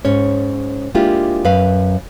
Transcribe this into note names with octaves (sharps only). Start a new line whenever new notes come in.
G#2 C#4 C#5
G#3 A#3 D4 E4 F4 G4
F#2 B4 F5